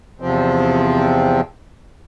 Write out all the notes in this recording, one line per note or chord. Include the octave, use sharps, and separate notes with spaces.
E2 C3 F3 C4